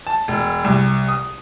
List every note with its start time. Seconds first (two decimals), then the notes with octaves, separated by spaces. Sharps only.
0.07 A5
0.28 E1
0.64 C2
1.08 D#6